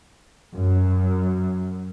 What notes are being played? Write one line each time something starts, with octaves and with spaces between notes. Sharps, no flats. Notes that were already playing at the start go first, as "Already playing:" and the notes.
F#2